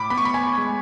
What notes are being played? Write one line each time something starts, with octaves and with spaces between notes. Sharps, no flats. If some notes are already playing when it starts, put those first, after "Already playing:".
Already playing: A2 B5 D6
B3 B5
C#6
B5
G#5
G#3